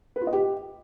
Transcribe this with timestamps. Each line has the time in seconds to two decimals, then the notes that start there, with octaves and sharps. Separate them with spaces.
0.16 B4
0.21 F4
0.27 D#5
0.33 G4